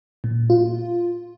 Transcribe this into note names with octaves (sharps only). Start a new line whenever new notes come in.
A#2
F4